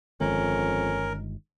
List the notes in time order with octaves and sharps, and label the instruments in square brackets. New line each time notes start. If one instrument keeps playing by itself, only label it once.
[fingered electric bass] G1 D#3 G#3 [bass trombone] F2 [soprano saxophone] C#4 [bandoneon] A#4